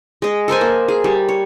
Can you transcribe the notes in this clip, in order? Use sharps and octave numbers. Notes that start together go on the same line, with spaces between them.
G#3 D#5
A4 A#4 C5 G#5
A#3
G#4
G3
C#5